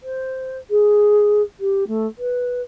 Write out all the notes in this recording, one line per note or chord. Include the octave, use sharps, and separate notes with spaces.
C5
G#4
G4
A3
B4